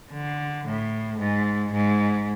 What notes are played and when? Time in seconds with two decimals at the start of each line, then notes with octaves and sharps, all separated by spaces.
0.11 D3
0.66 A2
1.18 G#2
1.72 G#2